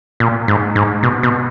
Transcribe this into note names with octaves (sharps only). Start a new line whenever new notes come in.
A#2
G#2
G#2
B2
B2